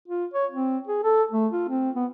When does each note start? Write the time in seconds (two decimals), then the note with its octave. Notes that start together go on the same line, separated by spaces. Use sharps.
0.08 F4
0.34 C#5
0.51 C4
0.87 G#4
1.04 A4
1.32 A3
1.53 F4
1.69 C4
1.96 B3